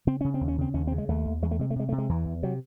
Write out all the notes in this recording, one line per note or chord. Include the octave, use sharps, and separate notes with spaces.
C#3 C4
C#3 C#4
C4
D#2
C#4
C#3 C4
D#2 C#4
C#3 C4
G#3
D#2 A3
D#2
E2 G#3
A3
C3 G#3
A3
C3 G#3
C3 A3
G#3
E2 E3
E2
C3 F#3